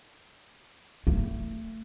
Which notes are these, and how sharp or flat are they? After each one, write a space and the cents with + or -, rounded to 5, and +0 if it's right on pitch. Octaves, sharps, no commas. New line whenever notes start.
A3 +30